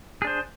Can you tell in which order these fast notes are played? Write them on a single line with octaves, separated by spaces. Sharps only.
G#4 D4 C5